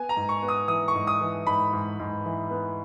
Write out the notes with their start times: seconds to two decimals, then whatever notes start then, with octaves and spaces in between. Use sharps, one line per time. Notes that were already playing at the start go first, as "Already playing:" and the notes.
Already playing: B3 G#5
0.09 A#5
0.17 G#2
0.29 C#6
0.42 B3
0.48 D#6
0.68 E3 D#6
0.88 C#6
0.95 G#2
1.07 D#6
1.21 E3
1.47 G#2 B5
1.73 G#2
1.99 G#2
2.25 E3
2.51 B3